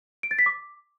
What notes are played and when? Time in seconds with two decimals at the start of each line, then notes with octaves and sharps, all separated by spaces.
0.23 D7
0.31 A6
0.39 B6
0.46 D6